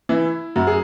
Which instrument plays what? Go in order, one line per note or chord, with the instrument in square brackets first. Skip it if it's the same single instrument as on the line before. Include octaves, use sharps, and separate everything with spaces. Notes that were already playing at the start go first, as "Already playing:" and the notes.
[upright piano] E3 E4
F#2 F#4
G#4